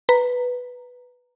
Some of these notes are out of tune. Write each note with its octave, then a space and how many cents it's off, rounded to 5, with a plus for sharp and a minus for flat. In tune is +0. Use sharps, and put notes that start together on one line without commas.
B4 +0 A#5 -5